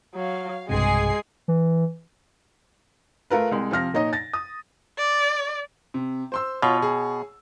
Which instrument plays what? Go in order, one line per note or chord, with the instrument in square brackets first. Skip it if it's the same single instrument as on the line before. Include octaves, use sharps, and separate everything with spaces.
[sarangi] F#3 [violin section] F5
[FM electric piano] B1 G2 C3 [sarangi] G#3 [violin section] G#4 G#5 C7
[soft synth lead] E3
[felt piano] A3 F4 A#4 B4
C2 G#3
C3 F3 F6 A#6
A#2 D#4 C#5 D#5
A6 A#6
D#6
[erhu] D5
[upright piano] C3
C5 C6 E6
[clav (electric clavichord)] B2 [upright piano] F4 C#5 F5
[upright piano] G#4 C#5